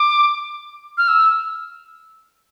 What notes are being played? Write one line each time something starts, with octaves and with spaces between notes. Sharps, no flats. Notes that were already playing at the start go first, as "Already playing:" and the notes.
Already playing: D6
F6
E6